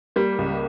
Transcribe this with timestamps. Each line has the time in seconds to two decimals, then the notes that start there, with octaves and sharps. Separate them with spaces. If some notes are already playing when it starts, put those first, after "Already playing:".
0.16 G3 A#3
0.38 C#2